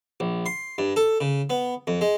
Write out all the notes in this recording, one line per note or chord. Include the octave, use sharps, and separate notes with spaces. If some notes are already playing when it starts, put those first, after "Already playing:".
A#1
C6
G2
A4
C#3
B3
F2
G#3